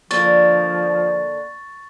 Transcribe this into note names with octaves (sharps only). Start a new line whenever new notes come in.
D3 F3 A#3 D4 C#6 A6